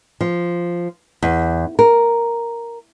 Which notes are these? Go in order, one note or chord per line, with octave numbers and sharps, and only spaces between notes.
F3
E2
A#4